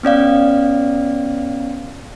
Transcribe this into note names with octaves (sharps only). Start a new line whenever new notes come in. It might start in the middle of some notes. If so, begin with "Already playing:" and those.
B3 C#4 D5 F5